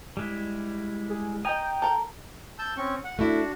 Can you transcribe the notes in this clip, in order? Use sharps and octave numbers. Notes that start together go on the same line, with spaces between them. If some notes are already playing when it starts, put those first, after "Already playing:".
G3 G#3 E4
G#4
D#5 G5 G#5 A#5 D#6
A4 A#4
A5 E6 G6
C4 C#4 C#6
F#5
A3 D4 E4 F#4